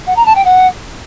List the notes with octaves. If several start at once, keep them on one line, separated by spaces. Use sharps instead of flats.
F#5
A#5
A5
G5
F#5